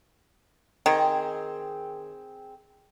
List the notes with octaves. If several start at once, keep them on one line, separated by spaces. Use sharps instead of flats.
D#3 C4 G#4